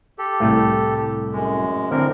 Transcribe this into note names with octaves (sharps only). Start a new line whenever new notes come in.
G4 A4
C2 A2 A3
F#2 G#3
A2 D3 C4 A#4